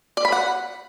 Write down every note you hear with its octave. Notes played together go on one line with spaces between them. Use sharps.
D5
B5
F#5